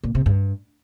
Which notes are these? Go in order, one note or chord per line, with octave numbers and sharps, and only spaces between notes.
A#2
C3
G2